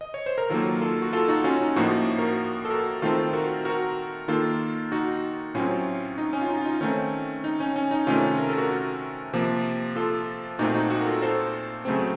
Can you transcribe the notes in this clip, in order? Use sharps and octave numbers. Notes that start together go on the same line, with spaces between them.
D#5
C#5
C5
A#4
D#3 F#3 A#3 F4 A4
F4 A4
F#4
F4 A4
D#4 F#4
C#4 F4
D#4
A2 F3 A#3 D#4 F#4
F#4 A#4
A4
F#4 A#4
D#3 A3 C4 F4 A4
F#4 A#4
F#4 A#4
D#3 A#3 F4 A4
D#4 F#4
A2 F#3 C4 C#4 F4
D#4
C#4
F4
D#4
F4
D#4
D#3 A3 C4 C#4
D#4
C#4
C#4
D#4
C3 D#3 A3 C#4 F4
A#4
A4
F#4 A#4
C3 F3 A#3
F4 A4
A#2 A3 C4 D#4 F#4
D#4 F#4
D#4 F#4
A#4
F4 A4
A4 C5
C#3 F#3 A3 C4